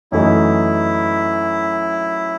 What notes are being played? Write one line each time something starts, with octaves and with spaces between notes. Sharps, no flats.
F#2 E3 A3 D#4 E4